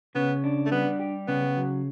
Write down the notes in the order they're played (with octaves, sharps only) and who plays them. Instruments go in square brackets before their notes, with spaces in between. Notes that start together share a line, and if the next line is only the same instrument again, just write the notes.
[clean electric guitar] C#3 [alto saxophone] B3
[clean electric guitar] D4
[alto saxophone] A3
[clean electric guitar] G3 [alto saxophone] B3
[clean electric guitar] G4
[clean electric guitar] C#3 [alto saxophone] B3
[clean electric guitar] F#3